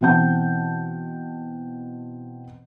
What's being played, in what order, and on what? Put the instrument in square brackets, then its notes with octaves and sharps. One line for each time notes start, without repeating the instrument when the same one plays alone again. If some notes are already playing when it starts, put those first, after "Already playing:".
[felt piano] B2 E3 C4 F#5 A5 G6